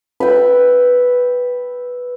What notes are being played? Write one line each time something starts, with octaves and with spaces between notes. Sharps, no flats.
B4 E5 G5